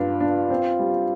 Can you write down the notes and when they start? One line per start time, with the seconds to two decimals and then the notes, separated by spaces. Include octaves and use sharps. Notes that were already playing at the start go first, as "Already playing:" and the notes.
Already playing: G2 D4 F4
0.21 D4
0.50 C4
0.79 G3